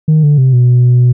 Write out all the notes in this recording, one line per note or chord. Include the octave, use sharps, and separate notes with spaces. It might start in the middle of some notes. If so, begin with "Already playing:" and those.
D#3
D3
C3
B2